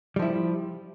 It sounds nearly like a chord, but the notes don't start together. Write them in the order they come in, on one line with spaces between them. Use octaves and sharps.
G3 F3 E4